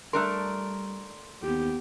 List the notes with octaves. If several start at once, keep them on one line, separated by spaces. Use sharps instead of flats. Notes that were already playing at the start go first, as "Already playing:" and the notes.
G3 A3 D4 A#4 C6
D#2 B3 G4